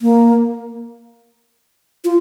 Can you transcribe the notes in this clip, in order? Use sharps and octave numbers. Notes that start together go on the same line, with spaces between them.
A#3
F4